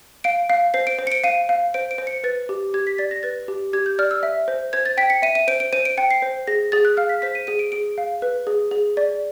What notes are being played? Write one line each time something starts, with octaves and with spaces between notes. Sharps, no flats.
F5 D7
F5
C5 C7
D7
C5
C#7
D7
F5 D#7
F5
C5 D7
D7
C5
C#7
B4 A6
G4
G4 G#6
B6
D5 A6
A#6
B4 A6
G4
G4 G#6
G6
D5 F6
E6
E5
C5
C5 G#6
A6
G5 B6
C#7
E5 D#7
D#7
C5 D7
D7
C5 D#7
D7
G5 C#7
C7
C5
G#4 A#6
G#4 A6
F#6
F5 F6
B6
C5 B6
D#7
G#4 D#7
D7
G#4 D7
F5
B4
G#4
G#4
D5